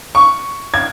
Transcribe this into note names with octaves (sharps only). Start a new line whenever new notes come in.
C#6
G#6